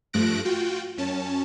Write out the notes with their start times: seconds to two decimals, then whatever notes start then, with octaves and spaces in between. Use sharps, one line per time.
0.13 G2 F3 A3 F#6 A#6 D7
0.45 F4 F#4 G5
0.97 F#2 C#4 A5